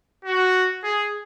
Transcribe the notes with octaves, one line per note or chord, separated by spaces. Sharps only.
F#4
G#4